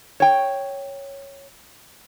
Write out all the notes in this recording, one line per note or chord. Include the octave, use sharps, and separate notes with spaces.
C#5 G5